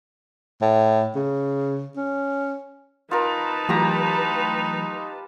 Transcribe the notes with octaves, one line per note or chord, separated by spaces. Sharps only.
A2
C#3
C#4
D#4 F4 A#4 B4 A5
E3 F#3 A3 F4 G4 A#5